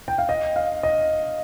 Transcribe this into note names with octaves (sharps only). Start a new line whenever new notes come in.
G5
F5
D#5
F5
D#5